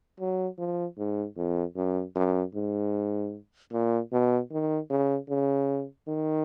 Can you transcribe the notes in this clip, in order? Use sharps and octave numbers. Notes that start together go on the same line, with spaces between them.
F#3
F3
G#2
F2
F#2
F#2
G#2
A#2
B2
D#3
C#3
C#3
D#3